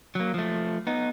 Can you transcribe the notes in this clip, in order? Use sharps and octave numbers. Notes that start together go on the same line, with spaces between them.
F#3 A#3
F3 A3
B3 D#4